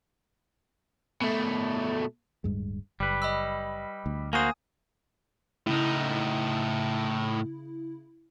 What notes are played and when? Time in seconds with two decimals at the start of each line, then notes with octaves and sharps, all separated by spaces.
1.22 B2 A3
2.44 D1 G2 G#3
3.00 F#1 G3 B4
3.22 D#5 B5 E6
4.06 D2
4.33 A#3 F#4 C5 G#5 D#6
5.67 A2 C#3 D#4 E4